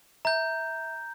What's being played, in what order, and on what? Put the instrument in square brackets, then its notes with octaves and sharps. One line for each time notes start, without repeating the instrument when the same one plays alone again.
[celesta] E5 [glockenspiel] A#5 G6